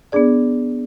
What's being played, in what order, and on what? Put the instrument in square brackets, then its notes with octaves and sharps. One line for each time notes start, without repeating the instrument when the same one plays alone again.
[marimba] B3 D4 G#4 D5